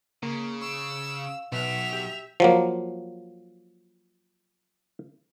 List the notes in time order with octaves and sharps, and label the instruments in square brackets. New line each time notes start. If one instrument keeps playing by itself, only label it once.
[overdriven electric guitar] C#3 [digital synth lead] A#3
[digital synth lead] C#6 [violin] E6
[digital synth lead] F5
[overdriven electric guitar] B1 [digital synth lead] B2 [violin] E5 F7
[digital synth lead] G4
[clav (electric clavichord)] F3 F#3 A#3